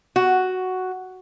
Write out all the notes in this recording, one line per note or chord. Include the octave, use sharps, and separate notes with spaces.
F#4